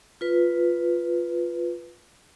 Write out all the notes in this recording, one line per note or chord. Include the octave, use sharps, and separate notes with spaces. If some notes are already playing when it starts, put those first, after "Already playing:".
F4 B4